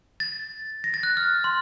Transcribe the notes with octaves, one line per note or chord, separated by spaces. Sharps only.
A6
A#6
A6
F#6
F6
C6